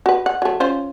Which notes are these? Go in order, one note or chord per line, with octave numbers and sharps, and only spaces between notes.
F#4 B4
F#5
F#3 A3
C#4 F4 C5